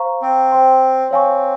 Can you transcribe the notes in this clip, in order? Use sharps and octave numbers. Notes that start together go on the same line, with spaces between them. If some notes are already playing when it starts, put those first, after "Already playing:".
Already playing: C5 F5 A#5 C#6
C4
C5 G5 C6
C4 C#5 F5 G#5 C#6